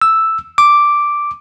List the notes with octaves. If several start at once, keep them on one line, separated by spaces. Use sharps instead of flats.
E6
D6